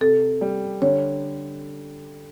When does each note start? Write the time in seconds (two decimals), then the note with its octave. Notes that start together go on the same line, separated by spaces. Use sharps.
0.01 C3 A4
0.41 G3
0.82 D3 C#5